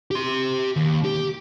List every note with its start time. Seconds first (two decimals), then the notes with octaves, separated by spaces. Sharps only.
0.11 G4 C6
0.76 D#2
1.05 G4